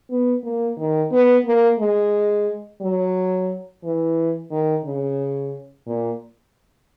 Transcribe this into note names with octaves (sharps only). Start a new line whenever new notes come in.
B3
A#3
D#3
B3
A#3
G#3
F#3
E3
D#3
C#3
A#2